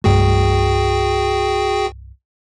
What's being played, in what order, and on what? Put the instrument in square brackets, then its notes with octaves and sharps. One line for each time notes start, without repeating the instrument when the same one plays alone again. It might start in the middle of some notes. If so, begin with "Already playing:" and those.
[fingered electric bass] C2 G2 A3 [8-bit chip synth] F#4 G#4 G5